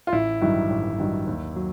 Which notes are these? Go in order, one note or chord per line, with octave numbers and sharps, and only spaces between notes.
F4
A1 E4
G2 D#3 F#3 E4
A1
G2 D#3 F#3
D#2
F#3